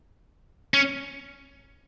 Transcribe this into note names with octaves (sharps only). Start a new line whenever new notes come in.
C#4